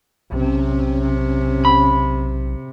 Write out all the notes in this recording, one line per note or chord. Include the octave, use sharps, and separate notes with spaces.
B1 C3 C#4
B5